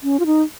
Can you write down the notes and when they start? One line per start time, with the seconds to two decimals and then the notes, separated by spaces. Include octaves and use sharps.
0.03 C#4
0.19 F4
0.26 D#4